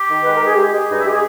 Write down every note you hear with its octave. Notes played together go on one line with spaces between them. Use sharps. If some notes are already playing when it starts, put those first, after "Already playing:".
Already playing: G4
D#3
G#3 B4
A#4
G#3 G#4
G#3 G4
G#3 G#4
G2 D#4
E4
G#3 G4
G#4